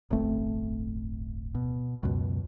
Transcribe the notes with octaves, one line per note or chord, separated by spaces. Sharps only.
D1 G1 A3 C4
B2
C#2 F#2 B2